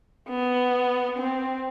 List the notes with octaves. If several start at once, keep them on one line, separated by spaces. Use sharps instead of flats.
B3
C4